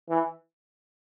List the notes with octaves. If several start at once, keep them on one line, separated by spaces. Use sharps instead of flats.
E3